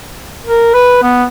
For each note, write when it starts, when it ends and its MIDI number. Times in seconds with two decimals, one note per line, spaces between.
0.46 0.73 70
0.74 0.99 71
1.03 1.25 59